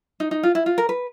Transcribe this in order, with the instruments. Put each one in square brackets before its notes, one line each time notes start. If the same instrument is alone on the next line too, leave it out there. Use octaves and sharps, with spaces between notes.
[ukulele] D#4
D#4
F4
E4
F4
A#4
B4